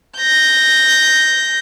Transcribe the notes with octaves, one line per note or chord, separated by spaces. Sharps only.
G6 A#6